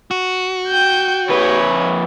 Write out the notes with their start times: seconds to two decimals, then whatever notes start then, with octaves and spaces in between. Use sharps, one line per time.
0.11 F#4
0.69 G5 G6
1.29 F2 B4 C#5